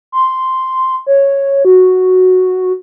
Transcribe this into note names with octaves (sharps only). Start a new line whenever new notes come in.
C6
C#5
F#4